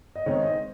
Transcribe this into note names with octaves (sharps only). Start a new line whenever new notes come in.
D#5
D#3 G#3 C4 D#4 C#5
C5 D#5